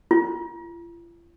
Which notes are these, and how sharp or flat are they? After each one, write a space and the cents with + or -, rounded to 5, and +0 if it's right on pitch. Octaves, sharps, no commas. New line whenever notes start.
F4 -45